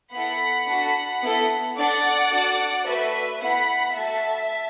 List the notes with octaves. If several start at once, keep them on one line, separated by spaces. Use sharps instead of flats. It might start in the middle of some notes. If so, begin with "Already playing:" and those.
B3 E4 A4 F#5 B5
D4 F#4 A4
B3 E4 A4
D4 A4 D5 F#5
D4 F#4 A4
A3 F#4 A4 B4 E5
B3 E4 A4 F#5 B5
A3 F#4 A4 E5 A5